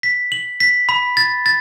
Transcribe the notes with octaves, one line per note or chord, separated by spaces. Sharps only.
B6
F#7
B6
B5
A6
A6